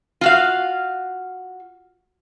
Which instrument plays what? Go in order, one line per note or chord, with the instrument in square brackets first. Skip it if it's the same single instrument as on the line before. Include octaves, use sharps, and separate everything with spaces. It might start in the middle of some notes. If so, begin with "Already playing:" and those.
[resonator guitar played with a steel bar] F4 F#4 F5